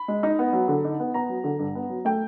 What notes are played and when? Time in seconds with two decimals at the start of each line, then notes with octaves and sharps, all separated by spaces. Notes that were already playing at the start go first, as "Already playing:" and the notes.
Already playing: B5
0.08 G#3
0.23 D#4
0.39 B3
0.53 F#3
0.68 D3
0.84 D#4
1.00 B3
1.14 B3 A#5
1.29 F#3
1.44 D3
1.59 G2
1.75 B3
1.90 F#3
2.05 A3 G5